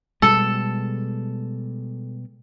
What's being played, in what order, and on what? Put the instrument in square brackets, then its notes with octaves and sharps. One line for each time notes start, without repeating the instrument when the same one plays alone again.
[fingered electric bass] B2 G3 G#3 [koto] A4